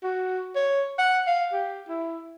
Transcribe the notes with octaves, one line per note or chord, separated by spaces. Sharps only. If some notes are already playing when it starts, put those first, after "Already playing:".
F#4
C#5
F#5
F5
G4
E4